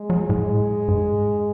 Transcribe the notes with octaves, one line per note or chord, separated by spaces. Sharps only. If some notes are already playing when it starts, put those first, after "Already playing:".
Already playing: G#3
F#3
A2
G#2